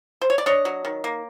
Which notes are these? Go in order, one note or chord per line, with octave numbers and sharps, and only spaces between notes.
C5
C#5
D5
D4 C#5 D#5
F#3
D#3
A#3